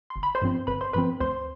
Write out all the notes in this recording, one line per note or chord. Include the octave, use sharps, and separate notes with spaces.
C6
G1
B5
C5 C6
G2 F3 C4
G1 B4 B5
C5 C6
G2 F3 C4 B4 B5
D2 C5 C6